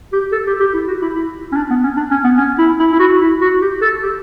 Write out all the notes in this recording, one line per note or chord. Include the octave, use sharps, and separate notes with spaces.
G4
A4
G4
G4
E4
F#4
E4
E4
C#4
D4
B3
C#4
D4
C#4
B3
C#4
E4
E4
E4
F#4
E4
F#4
G4
A4
G4